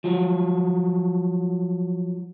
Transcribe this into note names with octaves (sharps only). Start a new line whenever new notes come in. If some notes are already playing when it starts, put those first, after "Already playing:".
F3 F#3